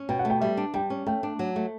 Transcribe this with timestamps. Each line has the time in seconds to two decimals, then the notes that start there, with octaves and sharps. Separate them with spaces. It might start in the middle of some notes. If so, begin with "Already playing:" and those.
Already playing: C#4
0.09 B2 G5
0.19 F#5
0.25 A3
0.30 G5
0.41 G3 E5
0.57 D4
0.74 G3 G5
0.90 C#4
1.06 A3 G5
1.23 D4
1.39 F#3
1.56 A3